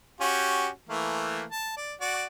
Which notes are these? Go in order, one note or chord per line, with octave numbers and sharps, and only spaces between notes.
C#4 F#4 G4
E3 A3 A#3
A5
D5
F#4 D5 F#5